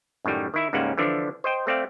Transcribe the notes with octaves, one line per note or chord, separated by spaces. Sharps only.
F#2 A2 D#3 G3
D#3 E4 E5
C#2 G#2 G3 A#3 C#4 F#5
D3 E3 F3 D4
C5 D#5 G5
A3 C4 D5 F5